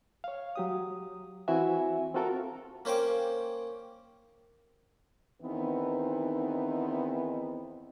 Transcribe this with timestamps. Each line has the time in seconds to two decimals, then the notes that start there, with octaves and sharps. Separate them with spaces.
0.24 C#5 F5
0.55 F#3 G4 D#6
1.48 E3 C4 E4 F#4 E5 G#5
2.14 C4 F4 F#4 A4 A#4 A#5
2.85 A#3 C#4 C5 G5 D6
5.42 E2 D#3 E3 B3 C4 D#4